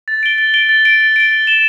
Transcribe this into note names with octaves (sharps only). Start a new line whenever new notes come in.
A6
D7 G7
A6
D7 G7
A6
D7 G7
A6
D7 G7
A6
E7 G7